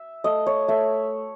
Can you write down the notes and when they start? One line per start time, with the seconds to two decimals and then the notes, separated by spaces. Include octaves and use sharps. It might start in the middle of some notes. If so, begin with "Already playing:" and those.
Already playing: E5
0.24 A3 D#5
0.46 C#5
0.68 A3 E5